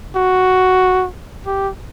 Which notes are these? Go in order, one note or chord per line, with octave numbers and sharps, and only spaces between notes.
F#4
G4